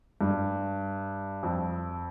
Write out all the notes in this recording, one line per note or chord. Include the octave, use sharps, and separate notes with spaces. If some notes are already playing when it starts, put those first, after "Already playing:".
G2
F2